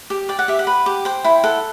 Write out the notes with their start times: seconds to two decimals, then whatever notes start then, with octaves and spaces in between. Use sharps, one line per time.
0.10 G4
0.29 D5 G5
0.39 F#5
0.48 G4 E5
0.59 F#5
0.67 B4
0.86 G4
1.05 C5 G5
1.24 E4 G5
1.44 A4 F#5